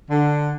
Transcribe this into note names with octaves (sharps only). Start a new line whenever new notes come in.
D3